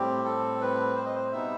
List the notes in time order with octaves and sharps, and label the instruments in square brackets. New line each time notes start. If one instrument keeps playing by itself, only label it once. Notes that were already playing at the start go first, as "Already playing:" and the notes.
Already playing: [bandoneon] A2 G3 C4 G4
A4
B4
C5
D#5
C5
B2 G3 B3 D#4 E5